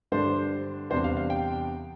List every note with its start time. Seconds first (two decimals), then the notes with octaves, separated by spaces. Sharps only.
0.12 G2 D3 G3 D4 C5
0.90 E2 C3 G3 D4 C5
1.04 F5
1.17 F5
1.30 G5